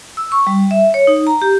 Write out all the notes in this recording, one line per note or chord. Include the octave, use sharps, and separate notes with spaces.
E6
C#6
G3
E5
C#5
D#4
A#5
G4